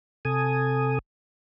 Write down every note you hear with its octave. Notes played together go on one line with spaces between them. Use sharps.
C3 A4 G#5 D#6